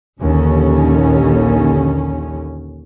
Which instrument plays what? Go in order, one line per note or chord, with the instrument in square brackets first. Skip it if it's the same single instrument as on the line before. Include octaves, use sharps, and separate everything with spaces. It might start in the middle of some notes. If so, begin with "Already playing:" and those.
[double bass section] A#1 D#2 D3 C#4